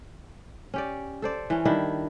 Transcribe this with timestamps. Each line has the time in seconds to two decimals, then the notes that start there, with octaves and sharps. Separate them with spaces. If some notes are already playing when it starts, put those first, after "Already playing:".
0.74 C#4 G4 D5
1.22 A4 C5 D5
1.50 E3 C#4
1.65 D#3 G3 D4 E4